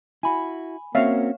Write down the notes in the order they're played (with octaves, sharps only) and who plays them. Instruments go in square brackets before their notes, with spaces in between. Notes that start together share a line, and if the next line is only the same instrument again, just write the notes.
[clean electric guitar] E4 F#4 [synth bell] G#5 B5
[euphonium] A#3 [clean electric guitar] C4 C#4 F#4 [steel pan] C#5 F5 [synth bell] E5